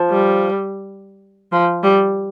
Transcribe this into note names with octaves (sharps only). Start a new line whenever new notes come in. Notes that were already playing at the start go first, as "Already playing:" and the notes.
Already playing: F3
G3
F3
G3